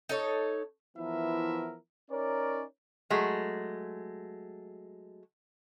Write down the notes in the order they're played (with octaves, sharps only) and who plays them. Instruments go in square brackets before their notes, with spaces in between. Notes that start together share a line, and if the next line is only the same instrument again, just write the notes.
[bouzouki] D#4 A4 C#5
[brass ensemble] E3 F3 B3 E4 A#4 E5
C#4 D#4 A#4 C#5 D5
[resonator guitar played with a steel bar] F#3 G#3 A3